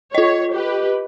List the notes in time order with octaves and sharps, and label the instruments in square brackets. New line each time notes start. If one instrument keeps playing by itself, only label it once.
[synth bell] F4 D#5 [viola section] C#5
[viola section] G4 B4